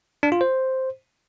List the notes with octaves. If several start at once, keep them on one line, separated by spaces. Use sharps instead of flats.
D4
F4
C5